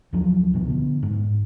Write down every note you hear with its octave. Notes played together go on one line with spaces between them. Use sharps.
D2 F3 F#3
C#2 B2 E3
D3 B3
G#2